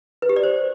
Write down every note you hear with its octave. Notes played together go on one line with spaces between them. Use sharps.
B4
G4
D5
C5